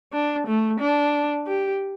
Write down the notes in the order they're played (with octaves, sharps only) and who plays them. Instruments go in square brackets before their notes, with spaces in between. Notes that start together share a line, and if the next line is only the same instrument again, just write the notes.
[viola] D4
A3
D4
G4